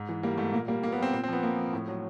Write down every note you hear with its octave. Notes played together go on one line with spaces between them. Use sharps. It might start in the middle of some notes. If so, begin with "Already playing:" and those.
Already playing: G#2
E3
G3 A#3
G#2 A3
A#2 A#3
G3 A#3
A#2 A#3
B3
G3 C4
A#2 C4
C4
F3 B3
A#2 A#3
F3
A2
F#3